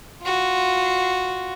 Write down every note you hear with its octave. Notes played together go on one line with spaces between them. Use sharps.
F4 F#4